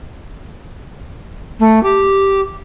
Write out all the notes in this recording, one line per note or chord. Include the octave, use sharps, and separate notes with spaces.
A3
G4